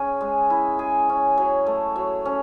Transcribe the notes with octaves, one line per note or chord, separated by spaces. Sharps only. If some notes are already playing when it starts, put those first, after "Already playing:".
Already playing: C#4 G#4
G#3
E4
G#4
C#4
F#3
A3
F#3
C#4